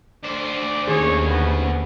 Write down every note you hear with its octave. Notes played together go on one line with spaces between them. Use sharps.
D2 C5 D5
D#2 D#3 C#4 G#4 C#5
B3